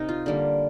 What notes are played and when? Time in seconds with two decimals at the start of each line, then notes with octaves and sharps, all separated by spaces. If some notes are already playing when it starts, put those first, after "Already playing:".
Already playing: C3 D#4 A#4
0.09 F4
0.26 D3 G3 A#3